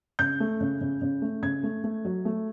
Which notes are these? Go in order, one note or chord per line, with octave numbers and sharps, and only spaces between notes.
C#3 G6
A3
C#3
C#3
C#3
A3
C#3 G#6
A3
A3
F#3
A3